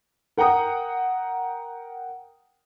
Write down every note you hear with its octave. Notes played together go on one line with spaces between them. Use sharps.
A#4 F#5 G5 A#5 D#6